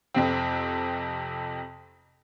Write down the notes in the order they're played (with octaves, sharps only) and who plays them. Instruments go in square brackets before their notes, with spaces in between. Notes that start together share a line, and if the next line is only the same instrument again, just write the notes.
[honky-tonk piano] F2 C3 C4